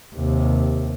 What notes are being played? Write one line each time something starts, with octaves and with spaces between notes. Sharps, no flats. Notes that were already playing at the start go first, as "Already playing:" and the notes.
D#2 C3